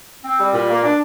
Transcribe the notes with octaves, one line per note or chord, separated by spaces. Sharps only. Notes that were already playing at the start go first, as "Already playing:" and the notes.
C4
G3
A#2
A#3
D4